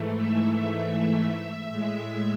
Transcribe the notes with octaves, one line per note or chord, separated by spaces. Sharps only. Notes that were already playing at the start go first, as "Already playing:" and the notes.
Already playing: G#2 E3 A3
E5
A2 G#3